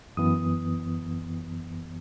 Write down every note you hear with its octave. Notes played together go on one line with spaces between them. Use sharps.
F#2 E3 B3 D#6